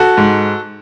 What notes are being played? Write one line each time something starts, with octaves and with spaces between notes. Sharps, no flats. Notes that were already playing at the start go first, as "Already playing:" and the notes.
Already playing: F#4 A4
G#2